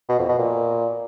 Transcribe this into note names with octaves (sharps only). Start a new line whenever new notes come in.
B2
F2
B2
A#2